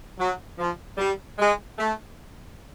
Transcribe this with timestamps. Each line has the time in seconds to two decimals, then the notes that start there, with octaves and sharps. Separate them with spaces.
0.18 F#3
0.58 F3
0.98 G3
1.39 G#3
1.79 A3